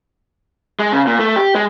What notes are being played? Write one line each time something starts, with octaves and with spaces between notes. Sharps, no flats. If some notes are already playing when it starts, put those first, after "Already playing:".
G#3
C#3
A#2
A3
G4
G#3